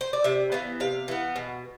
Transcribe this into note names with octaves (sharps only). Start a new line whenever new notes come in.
C5
D5
C3 E5
E3 B3 F5
C3 F5
E3 B3
B2